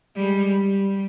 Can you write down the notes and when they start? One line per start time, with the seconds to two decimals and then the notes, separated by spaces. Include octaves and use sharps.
0.16 G3 G#3
0.60 G3